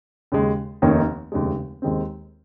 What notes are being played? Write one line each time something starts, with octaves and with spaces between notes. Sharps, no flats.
D#2 C#3 G#3
F1 D#2 D#3 A#3 C#4
F1 D#2 C#3 G#3
D#2 D#3 G#3 C4